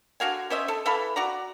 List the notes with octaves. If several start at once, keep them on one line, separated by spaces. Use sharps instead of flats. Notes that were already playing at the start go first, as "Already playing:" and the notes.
D3 F#4 F5 G#5
C#4 C5 D#5 E5
A4
E3 A4 F5 B5
F#4 D5 A#5